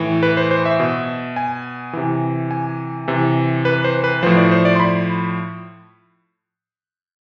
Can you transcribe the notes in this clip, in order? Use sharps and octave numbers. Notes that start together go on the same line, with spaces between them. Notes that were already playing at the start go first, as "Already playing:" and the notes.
Already playing: A2 E3
B4
C5
C5
E5
B2
G#5
C3 E3
G#5
C3 E3
B4
C5
B4
A2 F3 C5
D5
C5
D5
C6
B5